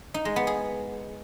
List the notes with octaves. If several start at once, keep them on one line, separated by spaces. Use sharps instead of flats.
D#4
G#3
B3
G#4